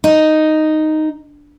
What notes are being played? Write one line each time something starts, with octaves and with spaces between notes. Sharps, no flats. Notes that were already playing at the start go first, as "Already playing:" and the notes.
D#4